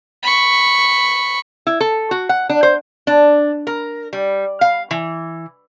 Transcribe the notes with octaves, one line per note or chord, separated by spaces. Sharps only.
B5 C#6
E4
A4
F#4
F#5
D4
C5
D4
A#4
G3
F5
E3